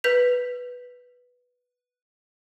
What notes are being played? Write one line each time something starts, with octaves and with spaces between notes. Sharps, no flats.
B4 G6 B6 F7